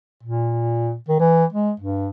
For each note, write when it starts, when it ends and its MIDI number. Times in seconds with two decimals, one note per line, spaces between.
0.23 0.95 46
1.08 1.19 51
1.20 1.45 52
1.52 1.72 56
1.80 2.09 43